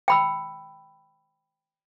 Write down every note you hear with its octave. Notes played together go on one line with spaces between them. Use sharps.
G5 B5 E6